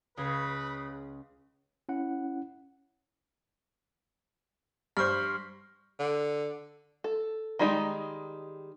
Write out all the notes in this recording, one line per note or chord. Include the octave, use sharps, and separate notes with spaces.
C#2 C#3 G#4 B4 D#6 A#6
C#4 E4 F#5
G2 C5 C#6 F6
D3
A4
D#3 G3 G#3 D#4